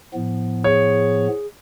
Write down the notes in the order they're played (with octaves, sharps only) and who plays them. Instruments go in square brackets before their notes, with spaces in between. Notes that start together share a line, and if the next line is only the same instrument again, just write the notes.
[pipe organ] A2 F3 B3
[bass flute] G#4 [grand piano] C#5